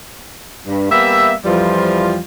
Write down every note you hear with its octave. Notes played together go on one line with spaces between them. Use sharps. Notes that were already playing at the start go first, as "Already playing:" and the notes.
G2
G3 A#3 B3 E5
F2 E3 F3 G3 F4